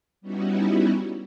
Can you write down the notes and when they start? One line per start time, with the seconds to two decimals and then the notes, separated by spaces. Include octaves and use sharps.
0.21 G3 B3 C#4 D#4 E4 F#4